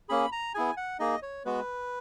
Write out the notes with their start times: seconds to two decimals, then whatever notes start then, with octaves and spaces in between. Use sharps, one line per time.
0.09 A#3 C#4 G#4 B5
0.32 A#5
0.54 B3 E4 G#4 G#5
0.77 F#5
0.99 A#3 D#4 G#4 D#5
1.23 C#5
1.45 G#3 B3 F#4 B4